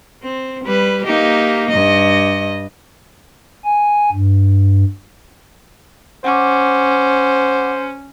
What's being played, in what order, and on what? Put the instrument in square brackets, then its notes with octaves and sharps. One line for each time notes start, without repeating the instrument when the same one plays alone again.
[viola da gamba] C4
G3 B4
A#3 D#4 G4
G2 D#5
[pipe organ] G#5
G2
[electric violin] C#4 [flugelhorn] C5 [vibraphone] F#5 C#6 D6